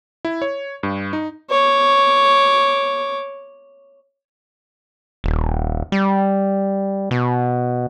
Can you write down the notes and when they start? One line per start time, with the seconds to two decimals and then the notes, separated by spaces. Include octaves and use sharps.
0.25 E4
0.42 C#5
0.83 G2
1.13 D#4
1.50 C#5 D6
5.24 D#1
5.92 G3
7.11 B2